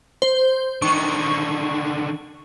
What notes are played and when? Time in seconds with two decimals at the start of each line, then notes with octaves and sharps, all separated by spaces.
0.22 C5
0.82 D3 D#3 C#6